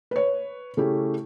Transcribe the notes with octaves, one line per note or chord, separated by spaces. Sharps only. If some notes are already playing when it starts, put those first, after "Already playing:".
B4 C#5
C#3 A3 C#4 E4 G4